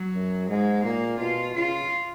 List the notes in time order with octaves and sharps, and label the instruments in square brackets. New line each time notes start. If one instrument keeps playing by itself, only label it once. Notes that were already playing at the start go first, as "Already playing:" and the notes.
Already playing: [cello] F#3
[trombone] F#2
[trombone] G#2 [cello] G#3
[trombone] A#2 [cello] A#3
[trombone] B2 [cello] F4
[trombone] C#3 [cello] F4